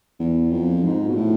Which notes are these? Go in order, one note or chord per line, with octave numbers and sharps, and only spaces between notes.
E2
F2
G#2
B2
A2